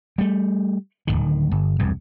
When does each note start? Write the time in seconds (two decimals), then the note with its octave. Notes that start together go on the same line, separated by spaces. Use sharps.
0.18 G3 A3
1.07 D1 B1 D#3
1.51 G1
1.79 E1 C2 G2